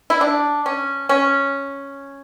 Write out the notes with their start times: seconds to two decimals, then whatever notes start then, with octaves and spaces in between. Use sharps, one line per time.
0.10 E4
0.21 D4
0.66 C#4
1.09 C#4